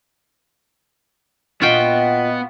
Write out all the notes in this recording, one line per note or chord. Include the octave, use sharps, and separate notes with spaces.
A#2 B3 F4 F#4 D#5 G5